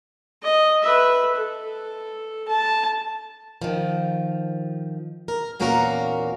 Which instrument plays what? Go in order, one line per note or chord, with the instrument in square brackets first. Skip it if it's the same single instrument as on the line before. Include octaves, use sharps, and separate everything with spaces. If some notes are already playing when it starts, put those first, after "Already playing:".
[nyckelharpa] D#5
B4 E5
A4
A5
[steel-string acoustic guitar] D#3 F3
A#4
E2 A#2 A#3 C#4 F#4 A#4